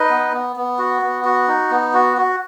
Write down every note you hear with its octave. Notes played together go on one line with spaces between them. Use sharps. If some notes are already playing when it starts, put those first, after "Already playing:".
Already playing: D#4 B4 D#5
B3
B3
B3
F#4
B3
F#4
D#4
B3
F#4
F#4